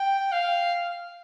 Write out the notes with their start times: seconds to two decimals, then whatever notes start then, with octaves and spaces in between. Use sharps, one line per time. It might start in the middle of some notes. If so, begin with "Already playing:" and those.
Already playing: G5
0.32 F5